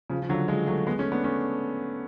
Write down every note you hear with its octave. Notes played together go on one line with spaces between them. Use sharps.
C#3 F3
F3
D3 F#3
F3 G#3
F#3 A3
G#3 B3
A3 C#4
B3 D4
A3 C#4